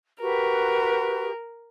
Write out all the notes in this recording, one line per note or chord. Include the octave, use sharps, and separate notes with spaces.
F#4 G4 A#4 B4